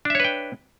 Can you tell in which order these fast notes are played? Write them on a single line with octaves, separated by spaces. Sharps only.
D4 E5 C#5 B4 G5